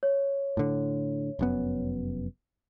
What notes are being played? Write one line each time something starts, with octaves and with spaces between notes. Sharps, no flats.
C#5
A2 D3
F1 F#2 B3